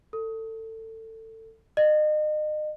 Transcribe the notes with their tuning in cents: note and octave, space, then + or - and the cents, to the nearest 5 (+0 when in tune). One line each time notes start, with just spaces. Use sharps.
A4 +25
D#5 -35